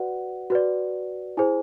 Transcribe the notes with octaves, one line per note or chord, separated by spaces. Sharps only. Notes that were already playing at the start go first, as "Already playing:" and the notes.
Already playing: F#4 B4 D5 F#5
F#4 B4 D5
E4 G#4 C5 G#5